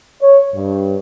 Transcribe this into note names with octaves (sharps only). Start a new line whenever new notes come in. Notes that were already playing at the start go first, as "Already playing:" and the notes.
C#5
G2